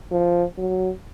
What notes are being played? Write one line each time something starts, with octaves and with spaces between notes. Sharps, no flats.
F3
F#3